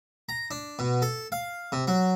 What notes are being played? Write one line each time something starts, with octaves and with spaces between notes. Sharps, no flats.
A#5
D4
B2
A4
F5
C3
F#3